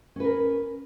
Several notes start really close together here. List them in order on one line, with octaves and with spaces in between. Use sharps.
C#4 B4 A#4